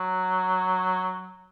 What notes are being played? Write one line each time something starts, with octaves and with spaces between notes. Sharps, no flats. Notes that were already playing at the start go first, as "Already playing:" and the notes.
Already playing: F#3